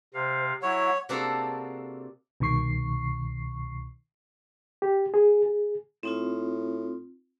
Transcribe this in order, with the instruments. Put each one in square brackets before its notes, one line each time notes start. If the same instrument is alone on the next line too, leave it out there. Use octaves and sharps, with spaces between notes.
[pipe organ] C3 F5 [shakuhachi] C5
[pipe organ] F#3 E4 [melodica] C#5 [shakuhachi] F#5
[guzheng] C3 A#3 D4 F#4 G#4 A4
[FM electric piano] C2 B2 D#3 C#6 C7
[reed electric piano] G4
G#4
G#4
[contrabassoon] A2 [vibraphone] C4 D#4 F4